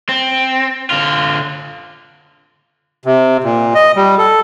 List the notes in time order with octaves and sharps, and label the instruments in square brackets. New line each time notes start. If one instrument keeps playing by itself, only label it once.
[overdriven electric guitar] C4
D3 F4
[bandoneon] C3
A#2
D#5
G3
A4